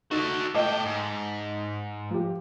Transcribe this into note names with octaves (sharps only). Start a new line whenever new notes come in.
D#4 F#4 A4
A2 D#5 G5 A5 D6
G#2
F3 G4